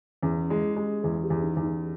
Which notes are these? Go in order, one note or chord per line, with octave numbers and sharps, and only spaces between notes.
E2 C#4
G#3 E4
G#3 G4
E2 G#4
G4
E2
D#4
E2
D#4